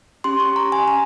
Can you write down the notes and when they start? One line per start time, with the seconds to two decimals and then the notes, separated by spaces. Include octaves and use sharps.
0.24 C#4 G4 C6
0.40 C#6
0.56 A#5
0.72 G#5
0.87 C#4 A#5